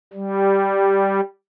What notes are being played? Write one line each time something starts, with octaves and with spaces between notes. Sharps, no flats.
G3